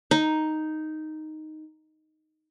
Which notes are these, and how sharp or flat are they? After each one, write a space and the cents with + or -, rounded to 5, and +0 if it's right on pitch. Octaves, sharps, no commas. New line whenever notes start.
D#4 +0